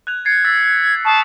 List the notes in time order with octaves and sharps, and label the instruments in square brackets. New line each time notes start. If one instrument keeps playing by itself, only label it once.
[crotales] F#6 G#6 F7
[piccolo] G#6 [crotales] A6 C7 C#7
[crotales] E6 A6 B6
[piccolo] A5 [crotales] C#6 D#6 C7